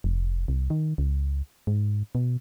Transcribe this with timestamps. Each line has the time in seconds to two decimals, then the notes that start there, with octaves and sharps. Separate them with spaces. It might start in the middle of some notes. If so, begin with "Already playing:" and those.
0.04 F1
0.48 C2
0.70 D#3
0.98 C#2
1.67 G#2
2.15 B2